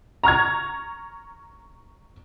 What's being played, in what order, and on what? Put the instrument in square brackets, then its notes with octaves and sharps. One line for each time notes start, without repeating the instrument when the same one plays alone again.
[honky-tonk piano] A#5 C#6 F6 G#6